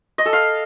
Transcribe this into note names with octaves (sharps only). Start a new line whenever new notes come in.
D#5
A4
F5